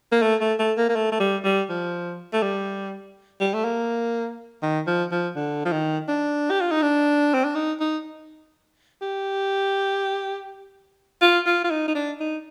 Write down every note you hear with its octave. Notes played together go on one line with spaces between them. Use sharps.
A#3
A3
A3
A3
A#3
A#3
A3
A3
G3
G3
F3
A3
G3
G3
A3
A#3
D#3
F3
F3
D3
F3
D#3
D4
G4
F4
D#4
D4
C4
D4
D#4
D#4
G4
F4
F4
F4
D#4
D#4
D4
D#4